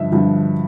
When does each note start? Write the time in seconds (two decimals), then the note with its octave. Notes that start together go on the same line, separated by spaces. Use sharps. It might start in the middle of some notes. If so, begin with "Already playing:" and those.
Already playing: G2 D3 F3 D#5 E5
0.12 G2 D3 F3